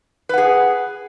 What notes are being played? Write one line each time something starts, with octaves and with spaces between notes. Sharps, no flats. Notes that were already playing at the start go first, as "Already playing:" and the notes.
G#4 B4 F#5